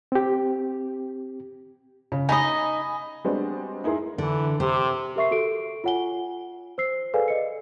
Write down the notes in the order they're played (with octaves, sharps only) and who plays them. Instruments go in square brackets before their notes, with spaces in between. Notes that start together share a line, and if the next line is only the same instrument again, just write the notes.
[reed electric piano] C4 G4
[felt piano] C#3
[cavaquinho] D#4 D#5 [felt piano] G#5 B5
[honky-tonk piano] G3 G#3 B3 C4 D4 F#4
D#4 E4 G#4 A#4 C6
[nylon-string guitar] D3 [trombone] E3
[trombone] C3 [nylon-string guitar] G4 C5
[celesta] G4 A#4 E5 C#6 C7
F#4 A4 D7
F4 C#5 F#5 G#5 G7
C5 E6 C7
G#4 A4 B4 D5 F5 G#5
D5 D#5 C#7